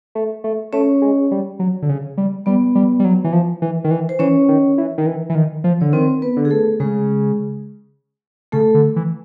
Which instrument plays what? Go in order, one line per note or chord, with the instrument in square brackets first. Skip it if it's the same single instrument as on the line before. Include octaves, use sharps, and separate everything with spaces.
[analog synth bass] A3
A3
[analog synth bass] A3 [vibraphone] C#4 C#5
[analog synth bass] G#3
G3
F#3
D3
C#3
G3
[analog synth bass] G3 [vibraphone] B3 B4
[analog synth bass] G3
G3
F#3
E3
F3
E3
D#3
E3
[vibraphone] C5
[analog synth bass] E3 [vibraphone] C#4 C#5
[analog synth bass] D#3
E3
D#3
E3
E3
D#3
F3
[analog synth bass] D3 [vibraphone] C#5
[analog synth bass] D#3 [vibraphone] C4 C5
[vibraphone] B3 B4
[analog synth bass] D3
[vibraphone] G#4
A3 A4
[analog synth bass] C#3 [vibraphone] G#3 G#4
[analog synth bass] C#3 [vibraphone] A3 A4
[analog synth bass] D3
E3